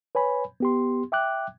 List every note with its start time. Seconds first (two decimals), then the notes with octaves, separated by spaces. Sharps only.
0.15 B4 C#5 G#5 B5
0.60 B3 G4 C6
1.12 E5 G5 D6 F#6